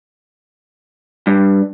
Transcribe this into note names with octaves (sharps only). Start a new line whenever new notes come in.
G2